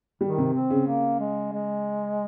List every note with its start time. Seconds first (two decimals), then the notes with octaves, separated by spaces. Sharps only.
0.21 D#3 G3
0.38 C3
0.54 C4
0.70 C#3
0.87 A#3
1.20 G#3
1.53 G#3